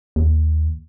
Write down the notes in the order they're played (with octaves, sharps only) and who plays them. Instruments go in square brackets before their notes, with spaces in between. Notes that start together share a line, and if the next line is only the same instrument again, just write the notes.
[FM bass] D#2